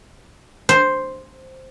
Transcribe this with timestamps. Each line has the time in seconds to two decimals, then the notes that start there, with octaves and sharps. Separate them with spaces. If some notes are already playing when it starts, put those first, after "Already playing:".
0.69 C5